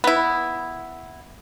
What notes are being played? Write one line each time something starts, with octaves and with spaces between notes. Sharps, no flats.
B3 E4